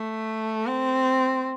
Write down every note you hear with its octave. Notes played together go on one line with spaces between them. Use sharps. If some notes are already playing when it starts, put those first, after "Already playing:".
Already playing: A3
C4